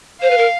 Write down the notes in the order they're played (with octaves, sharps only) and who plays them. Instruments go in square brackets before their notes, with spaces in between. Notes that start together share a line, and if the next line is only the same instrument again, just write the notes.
[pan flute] C5 [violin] F5
[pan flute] B4
A#4